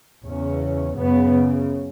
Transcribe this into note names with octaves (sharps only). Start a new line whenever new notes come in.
E2 C#3 C#4
F#2 C#3 B3